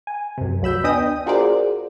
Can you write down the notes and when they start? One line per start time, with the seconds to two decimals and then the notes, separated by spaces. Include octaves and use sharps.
0.07 G#5
0.38 F#2 C3
0.62 D2 F#3 B5 E6 G6
0.84 B3 D4 D#5 G5 G#5 D#6
1.26 F4 F#4 G#4 A#4 C5 D5